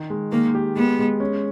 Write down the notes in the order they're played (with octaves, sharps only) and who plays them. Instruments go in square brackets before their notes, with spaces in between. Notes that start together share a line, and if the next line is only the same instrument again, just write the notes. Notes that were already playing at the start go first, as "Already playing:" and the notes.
Already playing: [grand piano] D#3
G#3
[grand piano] D#3 [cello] A#3
[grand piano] G4
[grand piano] G#3 [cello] B3
[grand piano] G#3
C#4